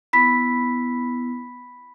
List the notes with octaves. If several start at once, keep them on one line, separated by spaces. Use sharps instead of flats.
B3 E4 B5 B6